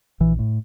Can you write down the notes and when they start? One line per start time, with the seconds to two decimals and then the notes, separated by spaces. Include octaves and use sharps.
0.20 A#1 E3
0.39 A2